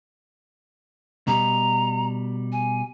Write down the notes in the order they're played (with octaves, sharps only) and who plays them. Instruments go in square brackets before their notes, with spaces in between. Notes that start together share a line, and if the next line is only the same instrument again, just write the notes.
[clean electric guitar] B2 G3 [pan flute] A#5
[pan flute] G#5